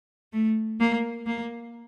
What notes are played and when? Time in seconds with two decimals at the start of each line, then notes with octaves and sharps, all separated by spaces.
0.33 A3
0.80 A#3
1.26 A#3